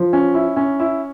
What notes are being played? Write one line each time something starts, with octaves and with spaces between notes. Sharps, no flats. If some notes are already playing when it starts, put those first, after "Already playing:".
Already playing: F3
C#4
E4
C#4
E4